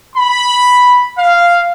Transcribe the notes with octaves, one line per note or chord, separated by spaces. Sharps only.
B5
F5